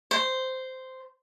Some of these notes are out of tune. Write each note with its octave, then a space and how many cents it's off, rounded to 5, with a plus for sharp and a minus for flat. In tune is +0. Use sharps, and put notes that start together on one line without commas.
C5 -10